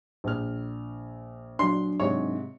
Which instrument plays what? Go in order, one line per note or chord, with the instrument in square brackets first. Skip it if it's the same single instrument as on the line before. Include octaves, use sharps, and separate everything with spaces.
[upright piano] A#1 F6
[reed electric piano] F#3 D4 [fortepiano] C6
[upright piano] G#2 C3 [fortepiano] C#5